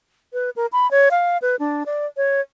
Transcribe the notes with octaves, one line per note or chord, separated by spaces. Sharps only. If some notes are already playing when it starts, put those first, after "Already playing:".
B4
A#4
B5
C#5
F5
B4
D4
D5
C#5